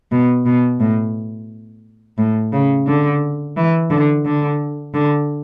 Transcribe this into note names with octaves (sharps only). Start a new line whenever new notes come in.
B2
B2
A2
A2
C#3
D3
E3
D3
D3
D3